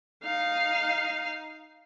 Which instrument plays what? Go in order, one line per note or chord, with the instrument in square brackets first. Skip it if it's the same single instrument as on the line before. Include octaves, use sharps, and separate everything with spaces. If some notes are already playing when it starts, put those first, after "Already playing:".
[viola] D#4 F5